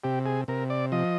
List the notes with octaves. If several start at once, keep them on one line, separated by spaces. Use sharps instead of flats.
C3 G4
G#4
C3 A#4
D5
F3 D#5